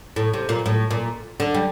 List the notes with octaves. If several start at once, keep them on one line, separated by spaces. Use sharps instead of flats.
A2
C3
A#2
A2
A#2
D3
G3